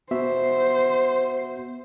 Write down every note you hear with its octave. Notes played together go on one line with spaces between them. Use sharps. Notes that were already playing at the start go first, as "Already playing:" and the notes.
B3 F#4 C5 E5